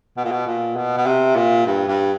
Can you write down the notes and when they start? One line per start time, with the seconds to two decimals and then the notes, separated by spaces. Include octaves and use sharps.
0.17 B2
0.24 A#2
0.31 B2
0.46 A#2
0.76 B2
0.98 B2
1.06 C3
1.36 A#2
1.66 G2
1.88 G2